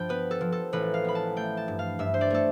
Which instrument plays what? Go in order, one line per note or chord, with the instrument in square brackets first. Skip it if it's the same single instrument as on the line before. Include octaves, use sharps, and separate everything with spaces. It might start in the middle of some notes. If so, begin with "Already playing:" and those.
Already playing: [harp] G2 F3 G5 A5 B5
B3 B4
A4
F3
A4
A1 B4
F5
B3 B5
A5
A3 G5
A5
G2
F5
G2 E5
C5
D5
A3 A4